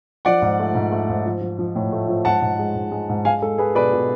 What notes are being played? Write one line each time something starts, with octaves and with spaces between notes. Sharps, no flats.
F3 D5 F#5
G#2
A3
G#2
A3
G#2
F3
F3
F3
A2
A3
F3
G#2 F#5 A5
G#2
G#3
G#2
G#3
G#2
G#3 F5 G#5
G#3 A4
G#3 G#4 B4
B2 B4 D5
B2